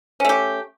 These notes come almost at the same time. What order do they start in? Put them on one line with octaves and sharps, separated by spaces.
C#4 A3 G4